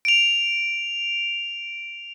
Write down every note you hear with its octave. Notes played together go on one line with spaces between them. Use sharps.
D7 F7